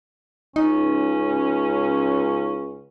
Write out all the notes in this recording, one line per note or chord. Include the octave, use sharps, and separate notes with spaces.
C#2 C#4 D#4